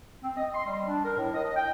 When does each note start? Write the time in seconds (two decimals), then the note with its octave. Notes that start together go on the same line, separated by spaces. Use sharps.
0.24 C4
0.37 D#5
0.54 C6
0.66 G3
0.87 D4
1.05 A#4
1.18 A2
1.34 D#5
1.56 G5